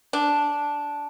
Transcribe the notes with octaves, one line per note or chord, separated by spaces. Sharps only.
D4